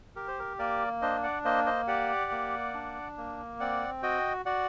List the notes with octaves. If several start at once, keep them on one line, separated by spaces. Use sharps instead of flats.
G4 A#4
C5
A#4
A#3 A#4 D5
D4 C5 D#5
D5 F#5
A#3 C5 D#5
C5 D#5
G4 D5 F#5
A#3
D4
A#3
C4 D5 F#5
F#4 D#5 G5
F#4 D5 F#5